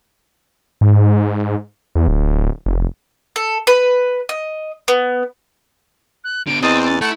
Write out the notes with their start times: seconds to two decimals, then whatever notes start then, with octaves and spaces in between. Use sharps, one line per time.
0.81 G#2
1.95 E2
2.08 D1
2.66 F1
3.36 A4
3.67 B4
4.29 D#5
4.88 B3
6.24 F#6
6.47 D3 B3 D7
6.63 E2 C4 D#5 A6
6.85 A6
7.01 A3 E4 E5 F#5